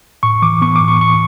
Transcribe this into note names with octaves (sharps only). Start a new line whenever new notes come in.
A2 C#6
E3 D6
B3 C#6
D6
A2
C#6
A2 C#6